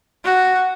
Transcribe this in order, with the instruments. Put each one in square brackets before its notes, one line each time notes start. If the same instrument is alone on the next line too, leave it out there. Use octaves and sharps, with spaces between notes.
[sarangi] F#4